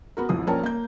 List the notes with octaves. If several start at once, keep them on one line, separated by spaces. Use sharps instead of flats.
B3 F#4 A#4
A1 F2 E3 D#6
A#1 C#4 A#4 C#5 G5 A5
A#3 G6